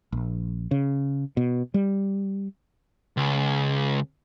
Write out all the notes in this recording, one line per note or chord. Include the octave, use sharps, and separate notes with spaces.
A#1
C#3
B2
G3
C#2